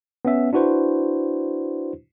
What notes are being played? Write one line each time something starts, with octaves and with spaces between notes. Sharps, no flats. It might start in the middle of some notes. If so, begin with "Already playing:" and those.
B3 C#4 E5
D4 E4 F#4 B4 C5